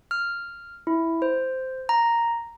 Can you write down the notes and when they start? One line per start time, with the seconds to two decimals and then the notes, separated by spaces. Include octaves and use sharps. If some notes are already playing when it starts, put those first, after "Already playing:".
0.11 F6
0.87 E4
1.22 C5
1.89 A#5